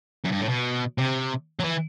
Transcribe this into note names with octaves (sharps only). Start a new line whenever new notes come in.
F#2
G2
A2
B2
C3
F#3
E3